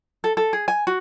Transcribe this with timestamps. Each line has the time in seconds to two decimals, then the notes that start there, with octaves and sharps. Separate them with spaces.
0.24 A4
0.37 A4
0.53 G#4
0.68 G#5
0.87 F#4